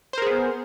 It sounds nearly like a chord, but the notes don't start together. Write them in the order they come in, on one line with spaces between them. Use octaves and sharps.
C5 A#4 G#4 B3